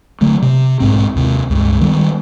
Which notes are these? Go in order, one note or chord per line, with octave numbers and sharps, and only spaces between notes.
D3 F#3 A3
C3
B1 G#2 C4
D#2 C3
C#2 G2
D#3 G3 B3